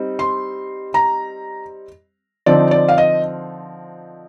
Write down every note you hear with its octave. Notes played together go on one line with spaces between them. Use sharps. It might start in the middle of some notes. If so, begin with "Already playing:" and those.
Already playing: G3 C4 D#4
C6
A#5
D3 F3 C4 D#4 D5
D5
F5
D#5